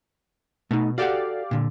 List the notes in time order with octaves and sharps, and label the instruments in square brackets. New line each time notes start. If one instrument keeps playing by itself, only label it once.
[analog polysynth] B2 [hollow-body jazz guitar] A3 D#4
[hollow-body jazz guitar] F#4 A4 F#5 [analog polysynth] G4 D5 F5
[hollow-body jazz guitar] A#2 D3